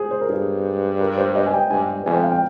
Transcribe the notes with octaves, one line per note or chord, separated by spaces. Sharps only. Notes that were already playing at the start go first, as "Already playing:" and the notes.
Already playing: G#4 C5
C5
A#4
G2 G#4
A#4
C5
D#5
G#5
G5
G2 G#5
F2 G#5
G5
F5
G5